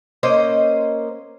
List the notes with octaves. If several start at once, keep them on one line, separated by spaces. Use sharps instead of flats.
A#3 C#4 C5 D#5